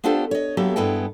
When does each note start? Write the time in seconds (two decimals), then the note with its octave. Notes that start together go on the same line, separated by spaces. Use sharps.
0.04 B3 D4 F4 G4 A4 C5
0.31 C#5 D#5
0.57 F#3 A#3 B3 G4 A4 E5
0.76 G2 G#3 B3 E4 A4 G5